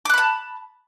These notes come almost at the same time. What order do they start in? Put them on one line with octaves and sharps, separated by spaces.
D6 F#6 B5 A5